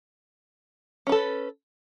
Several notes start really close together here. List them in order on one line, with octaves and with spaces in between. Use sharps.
C#4 B4 A4